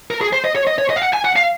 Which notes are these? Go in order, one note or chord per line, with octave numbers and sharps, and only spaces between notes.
A#4
G#4
C5
D#5
C#5
D#5
C#5
D#5
F5
F#5
G#5
F#5
F5